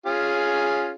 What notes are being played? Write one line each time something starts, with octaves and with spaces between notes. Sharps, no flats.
C#4 F4 G#4